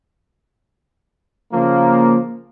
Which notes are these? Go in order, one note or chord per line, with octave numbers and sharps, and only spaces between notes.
C#3 F3 A#3